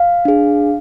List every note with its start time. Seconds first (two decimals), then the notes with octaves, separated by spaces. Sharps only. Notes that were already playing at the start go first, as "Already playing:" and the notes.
Already playing: F5
0.25 D4 G#4